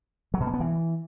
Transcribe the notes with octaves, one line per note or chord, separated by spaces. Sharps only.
F#3
B2
A#3
B3
E3